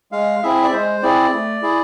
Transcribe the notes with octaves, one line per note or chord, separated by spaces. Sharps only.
G#3 F5
C4 E4 G#4 E5
D5
G#3 C5
C4 E4 G#4 D5
A3
E4 G#4